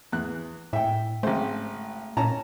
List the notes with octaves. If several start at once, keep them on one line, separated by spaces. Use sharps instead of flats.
E2 F#6
A2 E5 G5
G#1 C#3 A3 C5
A#2 C#4 A5 A#5